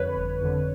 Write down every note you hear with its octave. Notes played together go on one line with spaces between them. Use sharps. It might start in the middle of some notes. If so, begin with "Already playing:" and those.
Already playing: F2 D3 B4 C#5
G1
F2 D3